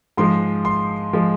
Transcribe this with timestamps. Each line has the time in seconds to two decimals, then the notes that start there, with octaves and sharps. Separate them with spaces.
0.17 G#2 F3 G#3 C6
0.65 C6
1.13 F3 G#3